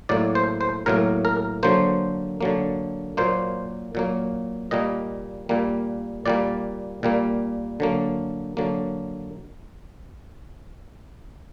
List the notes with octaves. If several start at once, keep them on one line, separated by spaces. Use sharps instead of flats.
A2 F#3 A#3 D5
C5
C5
A2 F#3 A#3 A#4
A#4
D3 F#3 A#3 C5
D3 F#3 A#3
A#2 F#3 A#3 C5
A#2 F#3 A#3
A#2 G3 A#3 D#5
A#2 G3 A#3
A#2 G3 A#3 D5
A#2 G3 A#3
D3 F#3 A#3
D3 F#3 A#3